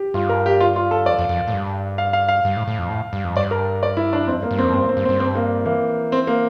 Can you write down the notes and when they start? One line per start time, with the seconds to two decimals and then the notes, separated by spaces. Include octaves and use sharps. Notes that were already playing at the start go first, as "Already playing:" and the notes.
Already playing: G4
0.14 G2 F4
0.29 A#4
0.46 G4
0.60 F4
0.76 F4
0.91 A4
1.06 F2 D5
1.19 F2
1.29 F2
1.48 A2
1.53 G2
1.98 F5
2.13 F5
2.29 F5
2.45 G2
2.56 A2
2.67 A2
2.79 F2
2.90 A2
3.13 G2
3.24 F2
3.36 G2 D5
3.51 A#4
3.83 D5
3.97 E4
4.13 D4
4.27 F2 C4
4.39 G2
4.43 A#3
4.51 G2
4.58 C4
4.63 F2
4.73 G2 C4
4.89 C4
4.97 G2
5.05 C4
5.09 G2
5.20 C4
5.35 A#3
5.66 E3 A#3
6.12 C4
6.27 A#3